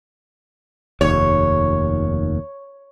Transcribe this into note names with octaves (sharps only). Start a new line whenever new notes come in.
F1 D#2 C#5